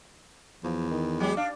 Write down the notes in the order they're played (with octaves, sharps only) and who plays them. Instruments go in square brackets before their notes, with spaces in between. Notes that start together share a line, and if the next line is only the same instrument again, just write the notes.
[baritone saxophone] E2 [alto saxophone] F3
[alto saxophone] D#3
[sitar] F#3 G4 [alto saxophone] G#3
[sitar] D4 [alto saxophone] F5